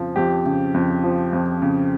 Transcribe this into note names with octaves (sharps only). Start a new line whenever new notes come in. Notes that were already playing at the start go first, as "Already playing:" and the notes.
Already playing: F2 C#3 F3
F2 G4
C#3
F2
F3
F2
C#3